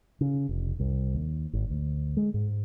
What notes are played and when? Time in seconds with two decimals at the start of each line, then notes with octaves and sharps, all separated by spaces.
0.21 C#3
0.49 F1
0.80 C2
1.15 D#2
1.53 G#1
1.70 D2
2.17 G#3
2.34 G#2